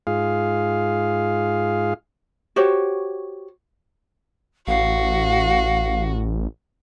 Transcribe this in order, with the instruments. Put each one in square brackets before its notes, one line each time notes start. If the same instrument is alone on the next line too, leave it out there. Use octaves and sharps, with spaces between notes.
[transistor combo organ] G#2 F4 G#4 F5
[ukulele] F#4 G4 C5 C#5
[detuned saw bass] A1 [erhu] F#4 [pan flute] F5